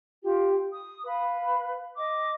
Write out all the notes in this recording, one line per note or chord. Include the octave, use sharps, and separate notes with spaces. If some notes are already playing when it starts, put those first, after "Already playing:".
F4 G4
D#6
B4 F5 B5
D#5 D6